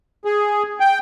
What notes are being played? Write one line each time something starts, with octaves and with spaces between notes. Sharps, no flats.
G#4
G5